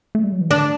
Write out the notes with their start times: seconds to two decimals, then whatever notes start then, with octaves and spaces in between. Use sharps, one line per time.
0.15 A3
0.24 G3
0.32 F#3
0.41 E3
0.50 D3 D4